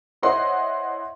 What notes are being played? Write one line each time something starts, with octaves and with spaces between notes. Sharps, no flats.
E4 C5 C#5 D#5 F#5 C6